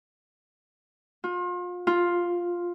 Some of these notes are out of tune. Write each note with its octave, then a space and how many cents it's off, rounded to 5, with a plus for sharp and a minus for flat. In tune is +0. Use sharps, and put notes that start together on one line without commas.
F4 +35
F4 +5